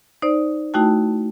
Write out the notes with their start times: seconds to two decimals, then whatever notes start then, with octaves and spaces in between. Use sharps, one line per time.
0.22 D#4 C5 D5
0.74 A3 D#4 E4 F#4 G5 A5